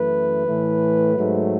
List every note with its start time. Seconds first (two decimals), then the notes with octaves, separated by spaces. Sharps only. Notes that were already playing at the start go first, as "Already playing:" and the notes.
Already playing: F#2 E3 A3 B4
0.46 A2 E3 A3
1.17 G#2 F#3 A3